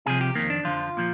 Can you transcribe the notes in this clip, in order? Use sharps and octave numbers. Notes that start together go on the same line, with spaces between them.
C2 C3 F3 G#4
G4
F2 D#3 A#3
D4
F2 D3 F3 F4
A#2 F3